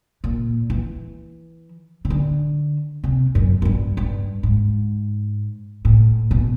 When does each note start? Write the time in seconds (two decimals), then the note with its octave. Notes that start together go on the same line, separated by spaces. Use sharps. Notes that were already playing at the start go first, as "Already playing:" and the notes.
0.24 A#2
0.70 E3
2.05 C#3
2.10 D3
3.04 C3
3.35 F#2
3.62 F#2
3.65 G2
3.97 G2
4.43 G#2
5.85 A2
6.31 B2